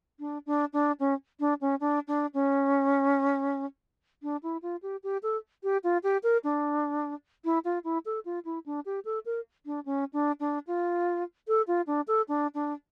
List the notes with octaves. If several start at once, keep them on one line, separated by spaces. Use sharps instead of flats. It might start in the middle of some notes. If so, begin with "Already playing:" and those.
D4
D4
D4
C#4
D4
C#4
D4
D4
C#4
D4
E4
F4
G4
G4
A4
G4
F4
G4
A#4
D4
E4
F4
E4
A4
F4
E4
D4
G4
A4
A#4
D4
C#4
D4
D4
F4
A4
F4
D4
A4
D4
D4